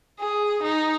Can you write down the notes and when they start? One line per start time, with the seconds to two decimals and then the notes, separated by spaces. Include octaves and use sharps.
0.19 G#4
0.63 D#4